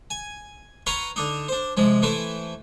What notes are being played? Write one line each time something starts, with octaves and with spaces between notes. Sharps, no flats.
G#5
B4 C#5 F5 F#5 A#5 C6
D3 D4 D#4
D4 C5
C3 F3 G#3
E3 A3 E4 B4 C5